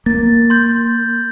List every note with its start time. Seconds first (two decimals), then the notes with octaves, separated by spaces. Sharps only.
0.06 A#3 A6
0.50 C6 G6